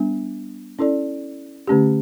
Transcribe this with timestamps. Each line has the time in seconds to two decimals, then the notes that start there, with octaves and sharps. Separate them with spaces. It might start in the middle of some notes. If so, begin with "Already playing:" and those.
Already playing: G3 B3 D4
0.79 C#4 E4 A4 D5
1.67 D3 A3 C#4 G4